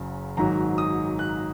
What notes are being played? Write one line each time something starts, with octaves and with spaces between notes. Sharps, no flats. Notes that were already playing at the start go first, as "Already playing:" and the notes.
Already playing: F#1 F#2 C#3
G#1 G#2 D#3 F#3 A#5
D#6
F#6